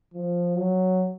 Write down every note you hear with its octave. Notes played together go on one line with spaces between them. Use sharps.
F3
F#3